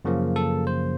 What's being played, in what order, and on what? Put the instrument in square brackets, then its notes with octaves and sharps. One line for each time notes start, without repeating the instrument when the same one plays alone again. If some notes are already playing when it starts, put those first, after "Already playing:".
[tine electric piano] F#2 C#3 F3 A#3
A4
C5